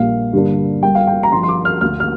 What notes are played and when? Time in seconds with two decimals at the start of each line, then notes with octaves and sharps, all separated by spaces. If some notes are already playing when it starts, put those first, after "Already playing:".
Already playing: A#1 A#2 G3 F5
0.33 G2 D3 G3 A#3 D4
0.82 G1 G2 G3 A#3 G5
0.95 F5
1.07 G5
1.23 A#5
1.32 G2 F3 A#3 D4 C6
1.43 C6
1.49 D6
1.65 F6
1.81 D2 D3 A#3 F6
2.00 F6